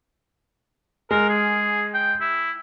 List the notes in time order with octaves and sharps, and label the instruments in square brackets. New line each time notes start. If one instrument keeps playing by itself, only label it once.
[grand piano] G#3 [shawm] A#4
[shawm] G#4
G5
E4